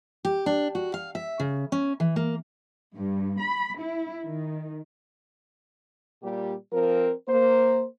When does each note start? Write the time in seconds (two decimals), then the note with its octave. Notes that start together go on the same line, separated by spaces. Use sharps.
0.25 G4
0.46 D4
0.75 F#4
0.94 F5
1.15 E5
1.40 C#3
1.72 C#4
2.00 E3
2.16 A#3
2.96 G2
3.41 B5
3.78 E4
4.24 D#3
6.23 A#2 G3 G4
6.73 F3 C4 A#4
7.29 A#3 C5